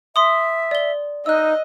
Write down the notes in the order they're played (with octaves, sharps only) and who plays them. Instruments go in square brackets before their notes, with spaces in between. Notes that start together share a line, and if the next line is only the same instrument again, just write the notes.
[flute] E5 [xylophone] C6 D#6
[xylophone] D5 G7
[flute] D#4 [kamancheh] D#5 [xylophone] E6 F#6